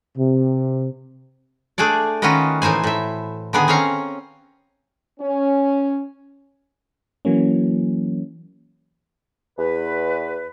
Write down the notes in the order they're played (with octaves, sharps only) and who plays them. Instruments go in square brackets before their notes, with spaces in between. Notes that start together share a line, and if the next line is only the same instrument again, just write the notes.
[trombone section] C3
[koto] A3 D4 G#4 A4 D5
D#3 C#4 F4 F#4 B4 D#5
A2 E3 D#4 C5 G#5
A2 E5
D3 D#3 B3 G#4 G#5
C4 C#4 C#5 F5 A#5
[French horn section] C#4
[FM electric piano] E3 F#3 A#3 C#4
[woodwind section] E2 B4